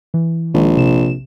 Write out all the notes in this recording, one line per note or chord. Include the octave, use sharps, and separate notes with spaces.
E3
A#1 D#3 G#3
C3 E7